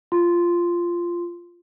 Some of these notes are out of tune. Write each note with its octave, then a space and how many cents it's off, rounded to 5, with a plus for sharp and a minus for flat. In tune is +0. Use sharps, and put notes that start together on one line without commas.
F4 -10 C6 -5